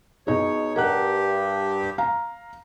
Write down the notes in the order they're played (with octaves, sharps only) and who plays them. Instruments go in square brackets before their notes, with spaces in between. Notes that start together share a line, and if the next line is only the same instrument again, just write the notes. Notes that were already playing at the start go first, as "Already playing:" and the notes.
[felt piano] B2 D#4 G#4 [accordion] C#5
[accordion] G2 G4 [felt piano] A#4 F#5 F#6
[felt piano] F5 A#5